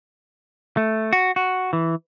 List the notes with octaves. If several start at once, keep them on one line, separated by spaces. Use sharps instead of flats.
A3
F#4
F#4
E3